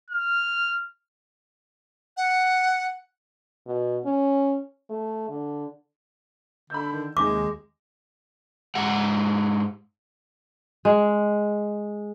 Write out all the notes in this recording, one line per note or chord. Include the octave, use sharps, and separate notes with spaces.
F6
F#5
B2
C#4
A3
D3
D3 B5 E6 G6
D#3
D#2 C3 G#3 G#5 D6 A#6
G#2 G#3 G4 F#5
G#3